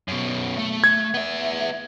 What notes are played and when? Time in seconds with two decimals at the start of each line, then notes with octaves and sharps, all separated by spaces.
0.08 F#2 B2
0.58 A3
0.84 G#6
1.14 B3 E5